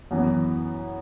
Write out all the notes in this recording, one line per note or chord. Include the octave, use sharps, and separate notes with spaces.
F#2 E3 B3